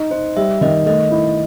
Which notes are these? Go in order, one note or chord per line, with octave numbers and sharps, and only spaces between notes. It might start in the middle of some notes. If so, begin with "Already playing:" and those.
Already playing: D#4
D#4 C5
G3 E5
D#3 D#5
A3 D#5
E4